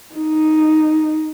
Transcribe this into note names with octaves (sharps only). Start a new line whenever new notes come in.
D#4